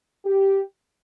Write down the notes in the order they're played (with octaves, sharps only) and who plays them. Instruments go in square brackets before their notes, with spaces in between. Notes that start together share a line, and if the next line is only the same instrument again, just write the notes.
[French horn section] G4